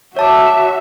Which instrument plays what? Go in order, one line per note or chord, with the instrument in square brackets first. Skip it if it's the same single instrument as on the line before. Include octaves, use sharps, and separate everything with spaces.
[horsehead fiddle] F#4 E5 [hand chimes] C#5 A5 D6